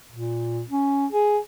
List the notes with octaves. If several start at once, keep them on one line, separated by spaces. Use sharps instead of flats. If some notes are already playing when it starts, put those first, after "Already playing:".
A#2
C#4
G#4